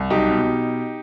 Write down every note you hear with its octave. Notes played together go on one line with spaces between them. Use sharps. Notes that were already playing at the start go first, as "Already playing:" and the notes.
Already playing: C2
B1 D#4 G4
B2